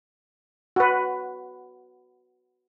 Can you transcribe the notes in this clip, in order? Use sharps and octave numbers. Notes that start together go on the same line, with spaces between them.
F#4 B4